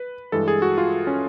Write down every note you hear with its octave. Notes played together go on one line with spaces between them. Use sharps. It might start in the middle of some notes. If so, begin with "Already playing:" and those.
Already playing: B4
G2 E3 G#3 A4
G#4
F#4
F4
C#4